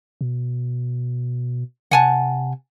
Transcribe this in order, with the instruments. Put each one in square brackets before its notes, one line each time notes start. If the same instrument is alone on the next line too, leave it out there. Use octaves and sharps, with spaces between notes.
[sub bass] B2
[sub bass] C3 [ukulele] F#5 G#5 A5